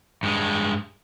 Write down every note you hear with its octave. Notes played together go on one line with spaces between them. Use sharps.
G2 G#3